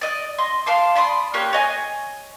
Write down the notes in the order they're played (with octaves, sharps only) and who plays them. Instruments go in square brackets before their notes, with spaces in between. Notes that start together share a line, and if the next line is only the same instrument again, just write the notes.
[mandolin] D5 D#5
D#5 C6
F5 A5 C6 D6
D5 B5 C6 D#6
A#3 C#4 G4 F#6
C#5 D#5 G#5